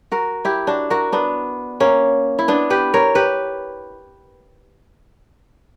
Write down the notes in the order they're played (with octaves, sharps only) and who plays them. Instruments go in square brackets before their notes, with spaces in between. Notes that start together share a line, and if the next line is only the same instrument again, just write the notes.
[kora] F#4 A#4
E4 G4
D4 F#4
F#4 A#4
B3 D4
A#3 C#4
E4
B3 D4
G4 B4
A#4 C#5
G4 B4